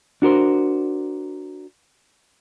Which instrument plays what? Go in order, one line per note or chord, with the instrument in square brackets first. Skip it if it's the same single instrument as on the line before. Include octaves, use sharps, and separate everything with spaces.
[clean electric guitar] D4 F#4 A#4 C5